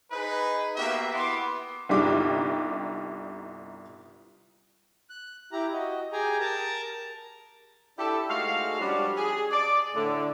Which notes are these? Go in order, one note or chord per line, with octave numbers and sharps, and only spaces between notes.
D#4 G#4 B4
A#3 B3 F#4 G4 E5
B3 E4 C6 D6
G1 C2 D4 D#4 G4 D6
F#6
E4 G4 A#5
F#4 D#5
G4 G#4 G5 G#5 A#5
A#4 A5 A#5
D4 E4 G4 A4
G#2 G#3 A3 F#4 F5
F3 G3 C#4 D4 F#4 G4
G#4
D5
A2 D3